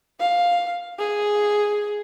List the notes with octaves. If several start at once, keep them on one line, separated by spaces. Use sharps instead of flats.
F5
G#4